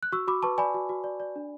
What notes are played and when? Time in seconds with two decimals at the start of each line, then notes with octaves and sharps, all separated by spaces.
0.03 F#6
0.12 F#4 C#6 E6
0.28 F#4 B5 D6
0.43 B4 A5 C#6
0.58 D5 G#5 B5
0.74 F#4
0.89 F#4
1.04 D5
1.20 D5
1.36 D4